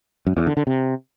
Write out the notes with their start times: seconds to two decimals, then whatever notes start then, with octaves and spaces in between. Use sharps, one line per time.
0.27 F#2
0.37 E2
0.47 D3
0.57 D3
0.67 C3